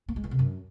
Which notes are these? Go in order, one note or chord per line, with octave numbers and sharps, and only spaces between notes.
A#3
G#3
E3
C3
F#2